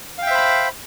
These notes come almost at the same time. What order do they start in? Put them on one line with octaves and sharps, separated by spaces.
F5 G5 E5 C5 B5